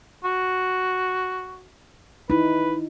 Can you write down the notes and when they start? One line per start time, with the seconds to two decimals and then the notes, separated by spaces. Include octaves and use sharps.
0.25 F#4
2.30 D#4 E4 B4